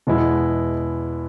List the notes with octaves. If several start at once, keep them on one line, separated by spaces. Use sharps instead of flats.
E2 B2 G#3 B3 E4